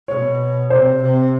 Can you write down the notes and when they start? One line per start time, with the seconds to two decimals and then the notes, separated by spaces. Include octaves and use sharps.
0.08 B2 C#5
0.70 C3 C5
1.02 C3